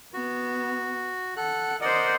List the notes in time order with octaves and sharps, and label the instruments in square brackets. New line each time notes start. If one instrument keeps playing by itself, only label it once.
[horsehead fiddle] B3 [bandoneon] F#4
[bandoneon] A4 F#6 [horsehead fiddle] F#5
[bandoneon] A#4 D5 F#5 [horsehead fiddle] C5 D#5